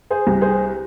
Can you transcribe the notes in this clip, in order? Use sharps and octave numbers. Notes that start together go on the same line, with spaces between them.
G#4 C5
C2
G#4 C5